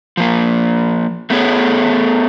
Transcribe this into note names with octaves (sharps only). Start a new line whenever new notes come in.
F3 A#3
A3 B3 G#4 C#5